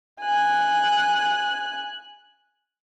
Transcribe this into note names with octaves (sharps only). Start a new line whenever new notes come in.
G#5 F#6